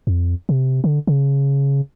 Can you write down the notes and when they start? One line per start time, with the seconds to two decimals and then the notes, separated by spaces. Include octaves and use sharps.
0.07 F2
0.49 C3
0.84 D3
1.07 C#3